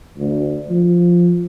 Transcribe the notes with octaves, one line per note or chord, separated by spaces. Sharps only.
D2
F3